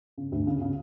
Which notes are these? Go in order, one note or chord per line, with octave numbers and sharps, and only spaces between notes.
C#3
D2
C#3
C#3